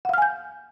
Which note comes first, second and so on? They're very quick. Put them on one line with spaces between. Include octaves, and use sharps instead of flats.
F#5 F5 F6 G#5 G6